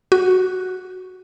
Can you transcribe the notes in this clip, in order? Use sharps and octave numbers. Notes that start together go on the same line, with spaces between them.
F#4